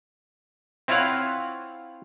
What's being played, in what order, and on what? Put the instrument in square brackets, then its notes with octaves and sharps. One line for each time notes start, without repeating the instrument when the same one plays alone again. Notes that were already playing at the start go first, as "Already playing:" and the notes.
[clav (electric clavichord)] C4 E4 F4 C#5 F5 F#5